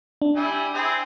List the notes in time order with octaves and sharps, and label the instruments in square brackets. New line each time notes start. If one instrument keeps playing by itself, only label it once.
[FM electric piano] D4
[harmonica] G3 E4 G#5
C4 E4 G#4